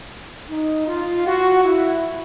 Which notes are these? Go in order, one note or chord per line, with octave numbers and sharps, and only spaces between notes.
D#4
F4
F#4
E4